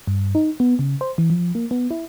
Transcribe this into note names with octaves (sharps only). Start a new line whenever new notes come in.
G2
D#4
B3
C#3
C5
E3
F3
A#3
B3
E4